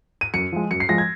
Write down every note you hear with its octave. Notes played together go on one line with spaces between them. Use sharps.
D#7
F#2 C#7
F3 G#3
F#2 C#7
C7
F3 G#3 A#6
G#6